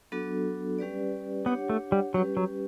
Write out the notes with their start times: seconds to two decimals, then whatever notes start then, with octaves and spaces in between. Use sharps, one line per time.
0.12 F#3 B3 D4 F#4 A4
0.78 G3 C#4 G4 B4 D5
1.46 B3 D4 G4 C#5 F#5
1.70 A3
1.92 G3
2.14 F#3 G3 C#4 G4 B4
2.37 F#3